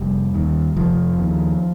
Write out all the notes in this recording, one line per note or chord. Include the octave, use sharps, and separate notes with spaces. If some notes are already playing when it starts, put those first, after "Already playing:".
Already playing: F1 G3
D#2
F1 F3
D#2